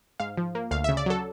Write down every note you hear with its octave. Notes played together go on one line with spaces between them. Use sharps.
G#2 F5
F3
A#3
D2 F5
C#3 E5
D5
F#3 A4